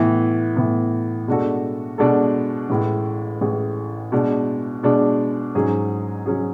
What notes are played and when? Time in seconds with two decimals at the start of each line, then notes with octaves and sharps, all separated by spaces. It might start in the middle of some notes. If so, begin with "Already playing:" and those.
Already playing: A2 E3 B3
0.56 A2 E3 B3
1.28 B2 G#3 D4 F#4 A4
1.98 B2 G#3 D4 F#4 A4
2.70 A1 A2 G#3
3.41 A1 A2 G#3
4.12 B2 G#3 D4
4.83 B2 G#3 D4
5.55 G#2 F#3 C#4 G#4
6.26 F#3 C#4 G#4